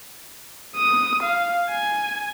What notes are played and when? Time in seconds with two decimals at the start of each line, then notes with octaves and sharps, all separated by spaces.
0.76 D#6
1.23 F5
1.69 G#5